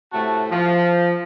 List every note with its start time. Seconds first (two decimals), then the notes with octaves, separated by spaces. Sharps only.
0.13 A2 C3 A3 F#4 A5
0.50 F3